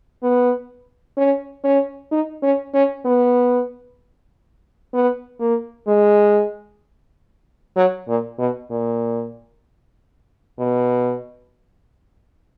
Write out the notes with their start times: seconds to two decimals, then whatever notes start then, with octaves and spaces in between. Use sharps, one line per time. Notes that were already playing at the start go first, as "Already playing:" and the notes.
0.23 B3
1.17 C#4
1.64 C#4
2.11 D#4
2.43 C#4
2.74 C#4
3.05 B3
4.94 B3
5.40 A#3
5.87 G#3
7.76 F#3
8.08 A#2
8.39 B2
8.70 A#2
10.59 B2